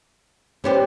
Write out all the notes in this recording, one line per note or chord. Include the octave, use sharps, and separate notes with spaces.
G3 B3 C#4 G4 C5